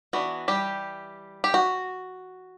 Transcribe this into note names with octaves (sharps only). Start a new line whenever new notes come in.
E3 B3 D4 F#4
G3 G4
G4
F#4